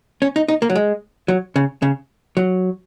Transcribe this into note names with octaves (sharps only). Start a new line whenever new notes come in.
C#4
D#4
D#4
A#3
F#3
G#3
F#3
C#3
C#3
F#3